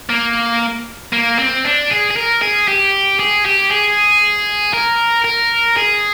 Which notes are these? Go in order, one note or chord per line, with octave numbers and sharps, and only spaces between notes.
A#3
A#3
C4
D4
G#4
G#4
A#4
G#4
G4
G#4
G4
G#4
A#4
A#4
G#4